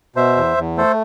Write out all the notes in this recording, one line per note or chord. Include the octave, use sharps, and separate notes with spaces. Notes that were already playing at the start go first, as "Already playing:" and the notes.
B2 C5 E5
E2
E2
A3 A4 C5